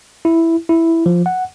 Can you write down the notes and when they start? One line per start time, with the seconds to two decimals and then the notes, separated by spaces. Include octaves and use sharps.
0.25 E4
0.69 E4
1.06 F3
1.26 F#5